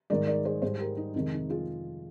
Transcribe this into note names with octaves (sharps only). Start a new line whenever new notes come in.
G#2 D#3 G#3 A#4 D5
A#4 D5
G#4 C5
G#2 G3 G#4 C5
G4 A#4
D#4
F2 C3 D#3 G#3 D#4
D#4
F4 G#4